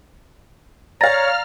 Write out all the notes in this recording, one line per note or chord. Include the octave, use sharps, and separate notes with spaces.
C#5 D5 F5 A#5 F6 A6 A#6